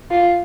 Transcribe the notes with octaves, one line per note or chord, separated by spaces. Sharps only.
F4